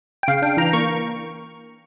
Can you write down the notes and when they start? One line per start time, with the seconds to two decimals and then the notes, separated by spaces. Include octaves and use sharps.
0.23 G5
0.28 C#3 F5
0.42 D4 G5
0.57 E3 A#5
0.73 A#3 C#6